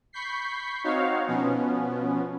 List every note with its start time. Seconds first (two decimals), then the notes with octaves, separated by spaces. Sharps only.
0.13 B5 C#6 G6 B6 C7
0.84 C4 D#4 F#4 C#5 F5
1.27 B2 F3 B3 C#4